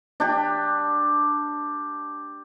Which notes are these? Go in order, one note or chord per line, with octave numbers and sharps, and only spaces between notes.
D4 G4